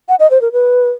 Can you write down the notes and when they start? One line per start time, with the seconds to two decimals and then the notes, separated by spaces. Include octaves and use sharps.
0.09 F#5
0.20 D#5
0.30 C5
0.41 A#4
0.52 B4